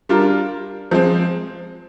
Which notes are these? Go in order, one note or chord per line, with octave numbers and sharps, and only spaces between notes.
G3 D4 F4 A#4
F3 G#3 C4